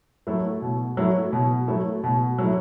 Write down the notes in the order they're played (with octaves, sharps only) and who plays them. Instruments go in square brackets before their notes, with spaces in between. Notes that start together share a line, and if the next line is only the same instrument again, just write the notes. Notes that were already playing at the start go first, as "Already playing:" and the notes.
[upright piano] F#3 A3 E4
B2
F#3 A3 E4
B2
F#3 A3 E4
B2
F#3 A3 E4